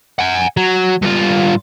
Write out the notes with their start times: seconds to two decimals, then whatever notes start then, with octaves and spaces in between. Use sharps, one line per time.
0.19 F#5 G#5
0.57 F#3
1.02 G2 F4